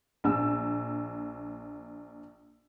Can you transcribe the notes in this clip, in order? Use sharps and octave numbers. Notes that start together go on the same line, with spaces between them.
A#1 E6